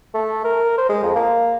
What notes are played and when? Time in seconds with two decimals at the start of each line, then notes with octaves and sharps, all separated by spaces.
0.14 A3
0.44 A#4
0.78 C5
0.89 G#3
1.03 F2
1.16 A#3